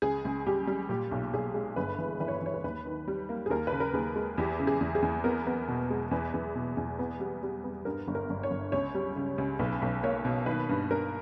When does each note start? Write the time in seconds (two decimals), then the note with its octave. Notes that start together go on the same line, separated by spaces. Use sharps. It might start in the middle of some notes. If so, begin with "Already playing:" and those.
0.02 C#2 G#4
0.25 C#2
0.46 G3 G4
0.67 G3
0.89 A#2 G4
1.11 B1
1.33 B1 G#4
1.54 G#3
1.76 G1 B4
1.98 E3
2.20 E3 B4
2.28 C#5
2.37 B4
2.42 E3 C#5
2.54 B4
2.64 D#2 B4
2.85 D#3
3.08 G3
3.29 A#3
3.46 G#4
3.50 D#2 A#4
3.67 B4
3.72 C#3
3.80 A#4
3.94 D#2 G#4
4.16 G#3
4.38 E2 G4
4.60 C#3
4.67 G#4
4.81 E2
4.95 G#4
5.02 E2
5.24 B3 A#4
5.47 B3
5.68 B2
5.90 G#3
6.11 E2 B4
6.34 E2
6.55 B2
6.77 E2
6.99 B3
7.20 G3
7.43 G3
7.64 B3
7.85 G2 A#4
8.07 G1
8.15 A#4
8.30 G1
8.43 C#5
8.51 G1
8.72 C#2 C#5
8.94 G3
9.16 C#3
9.38 C#2
9.59 B1 B4
9.82 B1
10.03 A#3 C#5
10.25 B2
10.46 D#3 B4
10.69 G2
10.90 G2 A#4